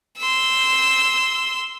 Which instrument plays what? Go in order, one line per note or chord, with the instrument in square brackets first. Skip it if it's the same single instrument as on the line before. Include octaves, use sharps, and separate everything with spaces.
[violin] C6 E6